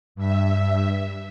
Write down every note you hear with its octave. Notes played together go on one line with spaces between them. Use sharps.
G2 E5